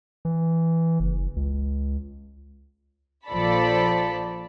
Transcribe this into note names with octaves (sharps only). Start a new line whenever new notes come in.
E3
F#1
C#2
A#1 F3 A4 D5 B5